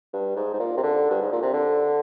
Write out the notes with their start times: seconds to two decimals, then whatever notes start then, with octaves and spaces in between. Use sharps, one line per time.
0.13 G2
0.36 G#2
0.53 G#2
0.60 A#2
0.77 C3
0.83 D3
1.11 G2
1.22 G#2
1.32 A#2
1.42 C3
1.53 D3